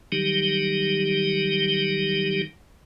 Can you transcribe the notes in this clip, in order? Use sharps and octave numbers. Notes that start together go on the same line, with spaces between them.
D#3 F#3 G3 D#4 G4